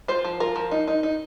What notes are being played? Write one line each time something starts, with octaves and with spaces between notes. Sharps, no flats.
F4 C5
F3
F4 A#4
F3
D#4
D#4
D#4